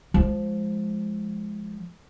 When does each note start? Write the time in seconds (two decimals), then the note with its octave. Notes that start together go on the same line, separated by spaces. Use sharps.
0.14 F3 G#3